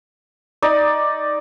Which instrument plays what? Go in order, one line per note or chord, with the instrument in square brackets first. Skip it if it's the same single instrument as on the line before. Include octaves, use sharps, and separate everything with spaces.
[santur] D#4 D5